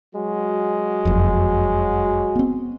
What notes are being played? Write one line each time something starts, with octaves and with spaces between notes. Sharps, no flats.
F#3 G#3 F#4
F#1 F2
B3 C4